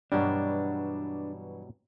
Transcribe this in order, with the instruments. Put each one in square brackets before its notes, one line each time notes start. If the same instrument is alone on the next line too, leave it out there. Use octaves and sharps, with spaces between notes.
[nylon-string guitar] G2 E3 B3 [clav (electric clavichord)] B2 F#3 G3 [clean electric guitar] D4